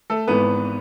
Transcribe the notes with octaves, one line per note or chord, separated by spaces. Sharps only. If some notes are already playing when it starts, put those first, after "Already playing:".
A3 A4
G#1 G#2 E3 B3 B4